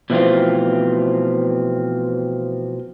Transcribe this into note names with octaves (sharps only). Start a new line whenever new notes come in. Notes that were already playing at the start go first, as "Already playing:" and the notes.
B2 E3 F3 A3 C4 F4